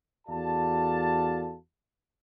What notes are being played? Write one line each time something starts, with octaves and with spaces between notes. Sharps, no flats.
E2 F#4 A4 D5 F5 A5